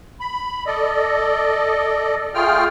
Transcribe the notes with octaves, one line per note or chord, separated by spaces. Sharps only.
B5
A4 D5 D#5
A3 F4 G#4 G5 F6